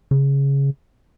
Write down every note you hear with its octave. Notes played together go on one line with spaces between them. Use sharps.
C#3